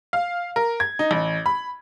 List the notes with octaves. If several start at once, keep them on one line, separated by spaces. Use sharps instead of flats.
F5
A#4
G#6
D#4
A1
B5